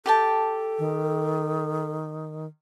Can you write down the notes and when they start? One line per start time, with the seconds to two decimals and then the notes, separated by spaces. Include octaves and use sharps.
0.06 G4 A4 G5 A5
0.79 D#3